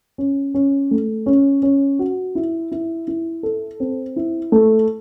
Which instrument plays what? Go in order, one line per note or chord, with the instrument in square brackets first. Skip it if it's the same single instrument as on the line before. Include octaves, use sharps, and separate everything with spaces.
[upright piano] C#4
C#4
A3
C#4
C#4
F#4
E4
E4
E4
A4
C4
E4
A3